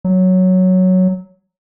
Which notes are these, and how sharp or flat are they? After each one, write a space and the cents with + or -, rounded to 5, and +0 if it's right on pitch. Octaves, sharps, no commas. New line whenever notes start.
F#3 +0